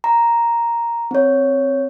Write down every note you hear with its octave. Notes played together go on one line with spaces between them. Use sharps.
A#5
C4 C#5